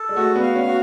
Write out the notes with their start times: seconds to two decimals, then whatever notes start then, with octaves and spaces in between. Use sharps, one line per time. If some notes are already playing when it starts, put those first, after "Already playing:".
Already playing: A4
0.09 G#3
0.16 A3 F#4
0.36 B3
0.42 F5
0.55 C#4
0.67 F#4